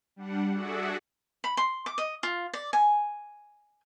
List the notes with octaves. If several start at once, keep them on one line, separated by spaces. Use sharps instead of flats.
G3 D4 F#5
F#4 G#4 A4 D5 E5 F#5
B5
C6
D6
D#5
F4
D5
G#5